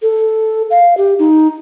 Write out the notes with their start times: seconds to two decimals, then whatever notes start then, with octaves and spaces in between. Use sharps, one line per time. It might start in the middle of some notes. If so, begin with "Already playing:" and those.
0.02 A4
0.71 F5
0.97 G4
1.19 D#4